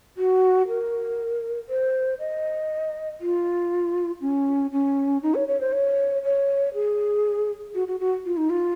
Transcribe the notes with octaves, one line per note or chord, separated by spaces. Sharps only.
F#4
A#4
C5
D#5
F4
C#4
C#4
D#4
C#5
C#5
C5
C#5
C#5
G#4
F#4
F#4
F#4
F4
D#4
F4